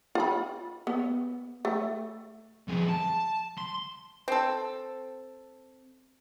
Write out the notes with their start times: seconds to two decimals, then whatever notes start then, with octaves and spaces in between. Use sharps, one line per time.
0.15 F4 B5
0.87 B3
1.65 A3
2.68 F2 G#4
2.89 A5
3.58 C6
4.28 C4 A4